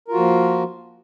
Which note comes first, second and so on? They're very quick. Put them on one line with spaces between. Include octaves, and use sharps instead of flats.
A#4 F4 F#4 F3 A#3